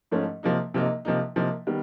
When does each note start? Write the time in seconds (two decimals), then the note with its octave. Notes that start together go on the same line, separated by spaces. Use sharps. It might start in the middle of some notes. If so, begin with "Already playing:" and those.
0.11 G#2 F3 A3 C#4
0.43 C3 F3 A#3 D#4
0.74 C3 F3 A#3 D#4
1.05 C3 F3 A#3 D#4
1.36 C3 F3 A#3 D#4
1.67 D#3 G3 B3